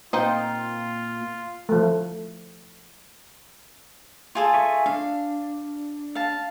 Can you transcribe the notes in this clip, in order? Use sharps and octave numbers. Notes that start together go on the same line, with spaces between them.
A#2 C4 D#4 F4 F5
F3 A3
F4 G#4 A4
E5 G#5 C#6
D4 F5
F5 A5